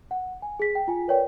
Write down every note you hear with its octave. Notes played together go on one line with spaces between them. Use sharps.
F#5
G#5
G#4 B6
G5
F4 G#5
A#4 B4 C#5 D5 G5